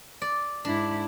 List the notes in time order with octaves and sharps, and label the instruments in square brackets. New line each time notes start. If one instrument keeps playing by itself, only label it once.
[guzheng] D5
[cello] G#2 E4 [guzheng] D4